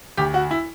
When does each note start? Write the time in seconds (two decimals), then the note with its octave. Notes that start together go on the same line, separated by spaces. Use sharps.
0.17 D2 G4
0.34 F#4
0.51 E4